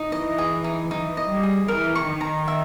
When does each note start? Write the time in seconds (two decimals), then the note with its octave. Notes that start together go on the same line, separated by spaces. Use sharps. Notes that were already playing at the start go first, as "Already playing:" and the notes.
Already playing: D#4
0.12 E3 D#5
0.38 G#4
0.64 D#4
0.91 E3 D#4
1.17 D#5
1.30 G3
1.43 G#4
1.68 E3 A#4
1.95 C#6
2.09 D#3
2.21 A#5
2.48 E5